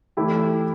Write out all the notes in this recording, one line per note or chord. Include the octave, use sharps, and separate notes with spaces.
E3 A3 E4 G4